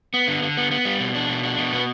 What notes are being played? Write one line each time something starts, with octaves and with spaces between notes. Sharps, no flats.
B3
D3
D3
B3
B3
G3
B2
D4
B2
D4
B2
B3